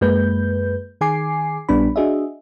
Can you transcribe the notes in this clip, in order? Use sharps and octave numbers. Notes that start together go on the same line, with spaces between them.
F#2 G#3 A#3 B4 G6
D#3 G#4 G#5 D6 C7
A#1 G3 B3 D4 B5
D4 F#4 G#4 D#5 E5